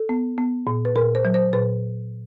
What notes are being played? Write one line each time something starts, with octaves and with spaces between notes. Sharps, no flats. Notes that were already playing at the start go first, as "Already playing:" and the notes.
Already playing: A4
B3
B3
A#2
B4
A#2 A#4
C5
F#3
C5
A#2 B4